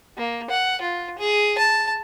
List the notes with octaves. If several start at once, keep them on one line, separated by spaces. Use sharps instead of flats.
A#3
F#5
F4
G#4
A5